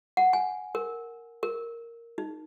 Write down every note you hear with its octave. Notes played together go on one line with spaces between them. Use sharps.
F#5
G#5
A#4
A#4
D#4